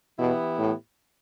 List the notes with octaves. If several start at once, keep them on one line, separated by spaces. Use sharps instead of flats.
B2 E3 B3 E4 G4
A2